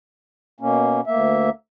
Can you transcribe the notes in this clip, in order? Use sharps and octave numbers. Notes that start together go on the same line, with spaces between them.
B2 A#3 C#4
D2 A#3 E5